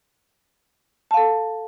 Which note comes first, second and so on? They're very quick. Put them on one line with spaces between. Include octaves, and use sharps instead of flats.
A5 F5 A4